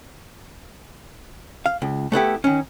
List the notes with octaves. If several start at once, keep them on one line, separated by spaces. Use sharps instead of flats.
F5
C#2
A3 B3 E4 G4
D#3 C#4